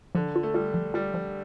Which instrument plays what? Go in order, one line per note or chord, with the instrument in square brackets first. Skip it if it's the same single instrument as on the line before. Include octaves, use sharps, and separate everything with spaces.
[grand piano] D3 [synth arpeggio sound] F3
[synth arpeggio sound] F4
[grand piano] A3
[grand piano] G3 [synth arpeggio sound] F4
[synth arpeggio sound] F3
[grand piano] G3 [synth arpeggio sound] F4
[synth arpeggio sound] F3